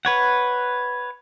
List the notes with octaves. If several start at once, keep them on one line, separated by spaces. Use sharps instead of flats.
B4 C#5 F#5